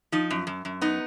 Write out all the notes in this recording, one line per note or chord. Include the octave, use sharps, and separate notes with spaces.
F3 D#4
F#2
F#2
F#2
B3 D#4